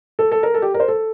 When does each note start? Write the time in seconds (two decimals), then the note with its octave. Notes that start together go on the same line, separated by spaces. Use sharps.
0.19 A4
0.32 A4
0.43 A#4
0.54 A4
0.62 G4
0.74 A#4
0.80 C5
0.88 A4